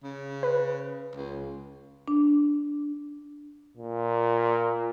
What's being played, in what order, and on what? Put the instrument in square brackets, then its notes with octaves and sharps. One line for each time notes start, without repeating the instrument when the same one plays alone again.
[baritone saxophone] C#3
[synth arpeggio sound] B4
[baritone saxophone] C#2
[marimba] D4
[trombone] A#2